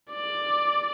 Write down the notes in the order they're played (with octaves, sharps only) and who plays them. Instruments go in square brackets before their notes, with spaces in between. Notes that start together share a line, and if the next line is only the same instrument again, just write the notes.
[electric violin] D5